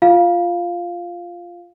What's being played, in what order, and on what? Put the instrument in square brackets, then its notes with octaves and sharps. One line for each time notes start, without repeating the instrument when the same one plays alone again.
[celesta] F4 F5